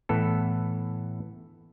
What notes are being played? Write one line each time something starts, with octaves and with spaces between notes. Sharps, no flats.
A2 E3 B3 A4